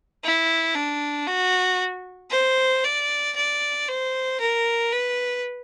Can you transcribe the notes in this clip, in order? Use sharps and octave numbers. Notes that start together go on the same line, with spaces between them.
E4
D4
F#4
C5
D5
D5
C5
A#4
B4